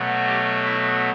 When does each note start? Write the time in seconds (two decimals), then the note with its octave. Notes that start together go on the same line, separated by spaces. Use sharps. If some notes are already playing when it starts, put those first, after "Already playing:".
Already playing: B2 F#3 A3
0.26 G4
0.65 E4